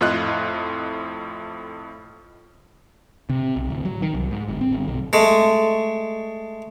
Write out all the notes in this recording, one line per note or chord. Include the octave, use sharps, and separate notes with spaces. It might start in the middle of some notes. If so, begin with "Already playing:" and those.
F2 A2 F4 D#5 F#6
C3
B1
D1
F#3
D#3
C2
G#2
G1
C4
G1
B1
G#3 A3